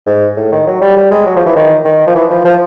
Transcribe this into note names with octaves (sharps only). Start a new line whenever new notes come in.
G#2
A2
D#3
F#3
G3
G3
G#3
F#3
F3
E3
D#3
D#3
F3
E3
F3
F3